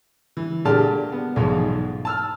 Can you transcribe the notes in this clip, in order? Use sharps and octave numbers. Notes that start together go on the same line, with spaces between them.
E3
A#2 D3 G#3 G4 A5 F6
B3
B1 E2 G#2 F3
A5 E6 F6